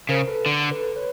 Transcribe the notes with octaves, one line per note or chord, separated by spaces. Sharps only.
C#3 A#4 C5
A4 B4
D3
A4 B4
B4 C#5